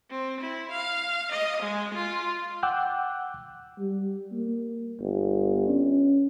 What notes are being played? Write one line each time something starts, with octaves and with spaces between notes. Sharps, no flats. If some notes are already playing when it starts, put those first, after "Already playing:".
C4
E4
F5
D#5
G#3
F4
F#5 G5 D6 E6 F#6 G6
G3
A#3
G1
C#4